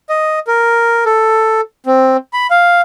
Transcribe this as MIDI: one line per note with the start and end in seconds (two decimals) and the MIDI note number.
0.09 0.39 75
0.47 1.04 70
1.06 1.61 69
1.86 2.17 60
2.33 2.47 83
2.50 2.81 77